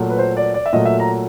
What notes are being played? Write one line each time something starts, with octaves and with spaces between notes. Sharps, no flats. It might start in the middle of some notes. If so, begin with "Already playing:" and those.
Already playing: A#2 F#3 A3
B4
C5
D5
D5
E5
A#2 F#3 A3 D#5
E5
A#5